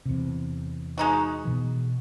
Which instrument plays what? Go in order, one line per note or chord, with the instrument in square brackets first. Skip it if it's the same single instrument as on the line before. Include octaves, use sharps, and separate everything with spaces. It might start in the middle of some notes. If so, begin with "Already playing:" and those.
[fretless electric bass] E2 C3
[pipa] G#3 D#4 F#4
[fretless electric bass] B2 E3